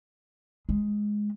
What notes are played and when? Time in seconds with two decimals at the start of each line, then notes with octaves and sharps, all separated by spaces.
0.69 G#3